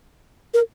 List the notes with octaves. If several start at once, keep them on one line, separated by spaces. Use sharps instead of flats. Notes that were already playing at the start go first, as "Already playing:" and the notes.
A#4